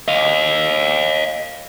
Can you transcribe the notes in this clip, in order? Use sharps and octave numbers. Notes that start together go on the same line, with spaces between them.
D#5 F5